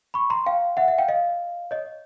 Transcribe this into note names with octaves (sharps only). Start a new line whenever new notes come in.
B5 C#6
A#5 C6
F5 G5
E5 F#5
E5 F#5
F5 G5
D#5 F5
C#5 D#5